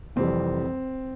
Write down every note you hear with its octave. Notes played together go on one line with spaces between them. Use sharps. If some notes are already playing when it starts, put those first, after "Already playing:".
F1 F2 E3 G3 C4